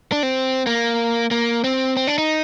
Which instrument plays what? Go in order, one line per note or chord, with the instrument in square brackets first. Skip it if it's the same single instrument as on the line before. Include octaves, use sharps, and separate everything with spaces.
[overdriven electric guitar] D4
C4
A#3
A#3
C4
C4
D4
D#4